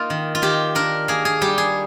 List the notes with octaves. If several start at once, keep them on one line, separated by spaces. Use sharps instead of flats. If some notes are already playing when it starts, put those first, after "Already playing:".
Already playing: A#3 D#4 F4
D#3
F4
D#3 G4
D4 A#4
A#3 G#4
G#4
G3 G4
G#4